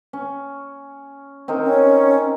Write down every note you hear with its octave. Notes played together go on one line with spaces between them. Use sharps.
C#4
C4 D#4 A#4
C#4